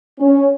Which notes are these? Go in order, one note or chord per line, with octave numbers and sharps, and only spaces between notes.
C#4